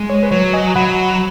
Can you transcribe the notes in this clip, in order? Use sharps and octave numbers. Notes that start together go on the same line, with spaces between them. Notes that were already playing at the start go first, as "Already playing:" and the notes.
Already playing: G#3
C#5
B4
F#3 C#5
D#5 G#5
F#3 F#5 B5